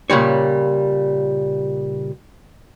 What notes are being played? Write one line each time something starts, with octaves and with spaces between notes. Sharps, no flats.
A#2 C#3 G3 C#5